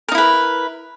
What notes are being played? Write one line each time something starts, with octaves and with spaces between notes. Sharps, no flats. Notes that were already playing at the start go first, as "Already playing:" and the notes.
D#4 E4 A#4 B4